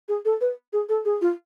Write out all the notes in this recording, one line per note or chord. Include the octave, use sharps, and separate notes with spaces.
G#4
A4
B4
G#4
A4
G#4
F4